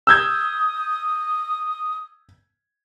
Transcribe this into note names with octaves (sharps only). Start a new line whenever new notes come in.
D#6 E6 G6 G#6